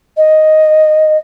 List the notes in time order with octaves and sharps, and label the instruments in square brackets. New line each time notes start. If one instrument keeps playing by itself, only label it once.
[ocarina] D#5